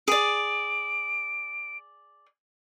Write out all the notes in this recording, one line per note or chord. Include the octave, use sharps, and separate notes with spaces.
G#4 D5 D7